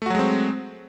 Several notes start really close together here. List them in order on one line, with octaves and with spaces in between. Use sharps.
A3 F#4 F#3 G#3 C4